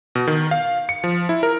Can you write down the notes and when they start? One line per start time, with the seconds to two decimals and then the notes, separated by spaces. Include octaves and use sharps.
0.15 B2
0.27 D#3
0.51 F5
0.89 C#7
1.04 F3
1.29 E4
1.43 A#4